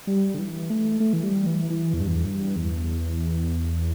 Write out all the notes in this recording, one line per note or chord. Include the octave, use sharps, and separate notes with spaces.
G3
D3
E3
A3
A3
E3
G3
E3
E3
E2
G2
E2
G2
E2